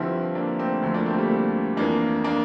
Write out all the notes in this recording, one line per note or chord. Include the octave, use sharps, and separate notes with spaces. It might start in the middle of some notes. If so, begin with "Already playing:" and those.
Already playing: G2 D3 F3 C4 E4
A#3 D4
A3 C4
D2 D3 F3 A3
A#3 D4
A3 C4
G3 A#3
A3
F2 E3 A#3 D4
A#3 D4